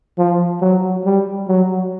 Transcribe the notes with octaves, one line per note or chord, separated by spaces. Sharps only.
F3
F#3
G3
F#3